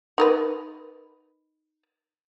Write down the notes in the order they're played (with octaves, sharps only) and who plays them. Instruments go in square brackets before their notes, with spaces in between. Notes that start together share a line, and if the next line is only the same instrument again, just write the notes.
[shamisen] D#4 A#4 B4